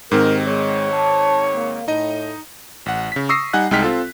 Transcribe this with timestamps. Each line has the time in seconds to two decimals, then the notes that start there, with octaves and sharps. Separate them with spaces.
0.11 G#2 D#3 C4 D#4 G4 A#4
0.47 G#3 C#5
0.93 A5
1.54 A#3
1.88 A2 D#4 D#5
2.86 A1 F#5
3.12 C#3 B6
3.29 C#6 D#6 E6 A#6 C7
3.53 G3 D#4 F#5 G#5 F#6
3.71 C2 G#3 D#4 G5 F6 B6
3.82 C4 F4 A4